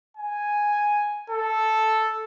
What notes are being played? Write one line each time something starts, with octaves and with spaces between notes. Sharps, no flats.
G#5
A4